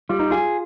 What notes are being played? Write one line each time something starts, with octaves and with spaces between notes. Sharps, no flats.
G3 F4
D#4
F4 G#4